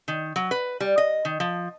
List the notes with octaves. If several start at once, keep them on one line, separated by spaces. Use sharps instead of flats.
D#3
F#3
B4
G3
D#5
D#3
F3